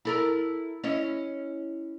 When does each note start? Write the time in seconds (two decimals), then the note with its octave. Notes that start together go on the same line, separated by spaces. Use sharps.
0.05 E4 A4 A#4
0.84 C#4 E4 D#5